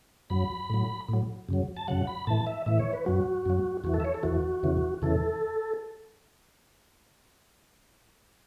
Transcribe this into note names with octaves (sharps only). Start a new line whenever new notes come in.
F#2 F#3 B5
A2 F#3
A2 F#3
F#2 C#3 F#3
A5
F#2 C#3 F#3 F#5
B5
A2 E3 A5
E5
A2 E3 E5
C#5
B4
F#2 F#3 F#4
F#2 F#3
E2 E3 F#4
A4
E5
C#5
A4
E2 E3 F#4
E2 C#3 E3
E2 C#3 E3 A4